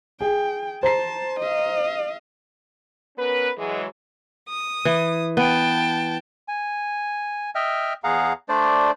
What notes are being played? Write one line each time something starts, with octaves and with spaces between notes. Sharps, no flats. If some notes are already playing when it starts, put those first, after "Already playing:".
G#4 G5
C5 A5 A#5 C7
D#5 F5
B3 C#4 A#4 B4
E3 F#3 G#3
D#6
E3
B3 G5 A5
G#5
D#5 E5 G5 F6
E2 G#4 F5 F#5 A#5
A3 D4 C5 D5